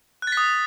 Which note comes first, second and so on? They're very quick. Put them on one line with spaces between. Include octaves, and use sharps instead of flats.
F#6 A6 B6 D#6